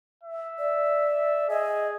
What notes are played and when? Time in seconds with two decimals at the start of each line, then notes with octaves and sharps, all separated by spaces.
0.23 E5
0.58 D5
1.49 G#4 D#5